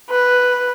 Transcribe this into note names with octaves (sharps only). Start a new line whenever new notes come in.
B4